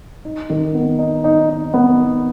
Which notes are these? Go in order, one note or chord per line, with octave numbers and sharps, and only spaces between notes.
D#4
D#3
B3
D#4
D#4
D#4
B3